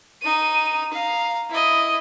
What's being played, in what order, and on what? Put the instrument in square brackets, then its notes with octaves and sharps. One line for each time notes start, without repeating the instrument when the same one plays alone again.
[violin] D#4 D#7
F5 A#5
E4 D#5